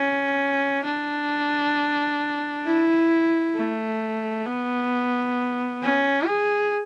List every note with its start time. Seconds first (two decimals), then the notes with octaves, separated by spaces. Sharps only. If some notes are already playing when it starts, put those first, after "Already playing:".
Already playing: C#4
0.84 D4
2.65 E4
3.55 A3
4.46 B3
5.82 C#4
6.27 G#4